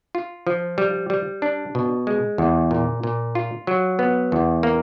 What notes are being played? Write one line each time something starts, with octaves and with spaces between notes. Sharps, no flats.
F4
F3
G3
G3
D4
B2
G#3
E2
A#2
A#2
F4
F#3
B3
E2
A#3